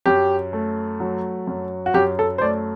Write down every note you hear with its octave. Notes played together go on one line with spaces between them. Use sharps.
F#2 G4
A3
F#3
F#2
F#4
F#2 G4
A4
C5
A3 D5